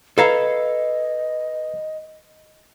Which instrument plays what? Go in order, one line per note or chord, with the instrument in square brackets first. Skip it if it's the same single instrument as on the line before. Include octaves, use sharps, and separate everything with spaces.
[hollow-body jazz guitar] A4 F5 A#5 [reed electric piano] B4 B5 G#6 [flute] D#5